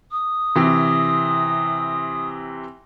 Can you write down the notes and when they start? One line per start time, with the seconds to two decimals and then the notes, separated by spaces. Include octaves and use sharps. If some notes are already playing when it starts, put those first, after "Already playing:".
0.11 D#6
0.55 C3 E3